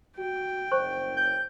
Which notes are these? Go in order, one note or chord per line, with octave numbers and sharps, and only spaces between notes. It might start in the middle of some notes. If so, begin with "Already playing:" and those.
F#4 G5
F#1 C5 C#6
G6